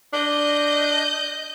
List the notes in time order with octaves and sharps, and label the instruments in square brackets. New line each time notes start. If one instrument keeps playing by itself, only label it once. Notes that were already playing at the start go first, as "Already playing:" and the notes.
[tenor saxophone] D4 [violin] D#5 G6